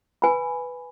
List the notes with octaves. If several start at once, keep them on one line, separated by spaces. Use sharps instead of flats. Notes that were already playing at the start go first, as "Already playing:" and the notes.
B4 G#5 B5